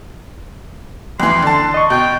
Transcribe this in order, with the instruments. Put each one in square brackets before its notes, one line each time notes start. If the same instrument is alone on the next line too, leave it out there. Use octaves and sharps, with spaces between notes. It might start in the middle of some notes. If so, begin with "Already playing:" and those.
[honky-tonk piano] F2 E3 [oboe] C6
[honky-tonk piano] D3 A5
[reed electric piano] D#5 C#6
[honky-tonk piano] B2 [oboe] G5